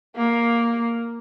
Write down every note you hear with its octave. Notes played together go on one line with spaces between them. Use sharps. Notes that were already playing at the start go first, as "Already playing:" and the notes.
A#3